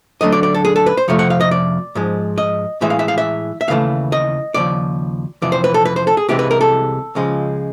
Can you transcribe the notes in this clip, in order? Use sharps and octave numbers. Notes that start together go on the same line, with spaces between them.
D2 D3 F#3 A3 D#5
D5
D5
A4
G#4
A4
B4
C5
F2 C3 F3 A3 C#5
F#5
F5
D#5
D5
G#2 F3 G#3
D#5
A2 E3 G#3 E5
F5
E5
F5
E5
E5
D#2 C#3 E3 A3 F5
D#5
D#2 C#3 F3 D5
F2 C3 E3 D5
C5
B4
A4
B4
C5
A4
G#4
C2 C3 E3 G#3 G4
B4
A#4
A4
C#2 C#3 F3 G#3